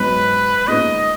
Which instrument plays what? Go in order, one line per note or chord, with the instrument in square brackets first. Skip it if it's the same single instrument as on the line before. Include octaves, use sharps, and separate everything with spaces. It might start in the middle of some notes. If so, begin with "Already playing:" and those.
Already playing: [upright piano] G#2 F#3 B3 [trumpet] B4
[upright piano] A#2 G#3 B3 D#4 [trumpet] D#5